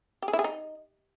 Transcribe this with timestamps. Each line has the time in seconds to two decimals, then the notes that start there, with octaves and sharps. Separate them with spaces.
0.22 G4
0.28 G#4
0.33 E4
0.39 G#4
0.44 D#4